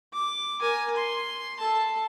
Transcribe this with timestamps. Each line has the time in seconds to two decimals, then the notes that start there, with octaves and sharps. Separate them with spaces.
0.13 D6
0.61 A#4 G#5
0.96 C6
1.59 A4 A5